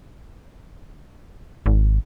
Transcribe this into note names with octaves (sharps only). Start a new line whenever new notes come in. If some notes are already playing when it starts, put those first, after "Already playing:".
G#1